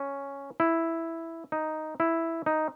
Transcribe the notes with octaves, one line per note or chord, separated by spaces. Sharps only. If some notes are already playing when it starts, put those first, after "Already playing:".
Already playing: C#4
E4
D#4
E4
D#4